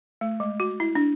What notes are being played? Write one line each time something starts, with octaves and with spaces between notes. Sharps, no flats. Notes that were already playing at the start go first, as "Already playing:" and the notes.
A3
G#3
F#4
E4
D4